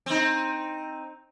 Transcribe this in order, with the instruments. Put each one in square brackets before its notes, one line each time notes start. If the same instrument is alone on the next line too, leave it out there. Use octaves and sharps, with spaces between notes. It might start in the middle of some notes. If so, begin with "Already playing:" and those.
[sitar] C4 D#4